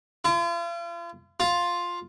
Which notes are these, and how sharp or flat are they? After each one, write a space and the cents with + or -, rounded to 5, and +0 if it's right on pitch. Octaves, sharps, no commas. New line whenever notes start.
F4 -40
F4 +5